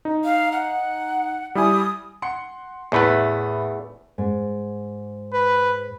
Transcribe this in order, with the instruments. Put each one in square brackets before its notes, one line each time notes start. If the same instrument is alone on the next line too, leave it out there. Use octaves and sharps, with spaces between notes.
[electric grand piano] D#4
[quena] F5
F#5
[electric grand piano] G3 E4 G#5 [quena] D#6
[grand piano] F#5 C6 C#7
[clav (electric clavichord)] E2 A3 B4 [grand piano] A2 B3 B5
[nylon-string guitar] G#2
[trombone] B4